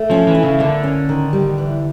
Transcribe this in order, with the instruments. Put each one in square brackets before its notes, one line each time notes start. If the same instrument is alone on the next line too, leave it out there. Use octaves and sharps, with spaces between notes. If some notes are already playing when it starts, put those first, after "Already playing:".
Already playing: [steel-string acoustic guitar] A3
[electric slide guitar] F3 [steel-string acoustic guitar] C#4
[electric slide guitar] E3
[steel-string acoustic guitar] E4
[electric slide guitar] C#3
[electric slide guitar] D3 [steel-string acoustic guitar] A#3
[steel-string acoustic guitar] C#4
D#3
G3
E3